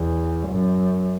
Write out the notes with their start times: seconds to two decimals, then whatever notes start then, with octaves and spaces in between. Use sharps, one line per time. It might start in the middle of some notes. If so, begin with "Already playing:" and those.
Already playing: E2
0.48 F#2